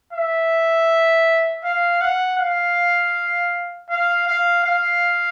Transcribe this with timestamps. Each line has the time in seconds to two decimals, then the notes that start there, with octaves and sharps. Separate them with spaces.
0.13 E5
1.64 F5
2.01 F#5
2.39 F5
3.90 F5
4.27 F5
4.64 F5